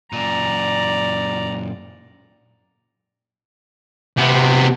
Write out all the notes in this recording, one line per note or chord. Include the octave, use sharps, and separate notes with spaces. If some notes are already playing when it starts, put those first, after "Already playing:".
F#2 A#2 D5 A#5
C3 B3